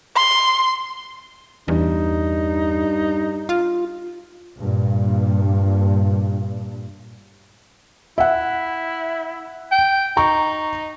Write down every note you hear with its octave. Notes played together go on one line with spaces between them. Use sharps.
C6
E2 G2 D#4
F4
G2 A#2
E4 E5 F#5
G5
D#4 A#5 C#6